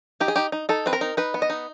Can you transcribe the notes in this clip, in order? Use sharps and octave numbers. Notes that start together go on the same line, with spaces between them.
D#4 G4
G#4
D#4 G4
D#4
D#4 A4
C4 B4
A#4
D#4
D#4 B4
B3
D#5
D#4